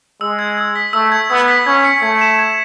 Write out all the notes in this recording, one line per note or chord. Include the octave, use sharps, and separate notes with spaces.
G#3 E6
G#6
E6
B6
A3 E6
G#6
B3 E6
B6
C#4 G#6
C#7
A3 G#6
E7
G#6